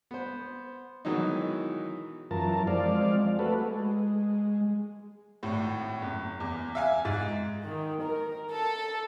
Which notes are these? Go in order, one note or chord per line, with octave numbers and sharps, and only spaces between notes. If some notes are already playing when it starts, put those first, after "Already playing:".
B3 C5
B2 D#3 E3 F#3 G#3 D#4
F#2 E3 F4 A#4 A5
F3 G#3 C4 D5 F5
A3 F#4 A4 B4
G#3
G#1 A2
F#1
E2
E5 F5 G#5
G#2 A6
D#3
A#4
A4